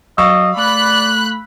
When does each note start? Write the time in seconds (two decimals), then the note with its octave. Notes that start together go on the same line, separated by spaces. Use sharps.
0.18 F#3 D#5 F5 C#6 E6
0.57 A3 D5 B5 F#6